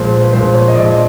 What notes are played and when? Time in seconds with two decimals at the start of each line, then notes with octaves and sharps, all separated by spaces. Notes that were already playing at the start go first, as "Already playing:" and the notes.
Already playing: A#2 F3 G#3 C5
0.22 B4
0.33 A#2 F3 G#3 C5
0.54 C#5
0.68 D#5
0.75 A#2 F3 G#3 D5